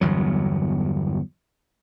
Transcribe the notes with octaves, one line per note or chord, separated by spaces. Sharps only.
G1 E2 F#3